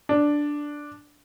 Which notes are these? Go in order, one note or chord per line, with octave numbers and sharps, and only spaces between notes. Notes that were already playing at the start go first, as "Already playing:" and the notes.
D4